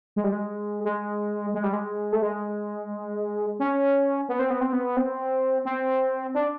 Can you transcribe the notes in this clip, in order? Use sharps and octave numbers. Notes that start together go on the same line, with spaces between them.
G#3
G3
G#3
G#3
G#3
G3
G#3
A3
G#3
C#4
B3
C4
B3
C4
B3
C4
C4
D4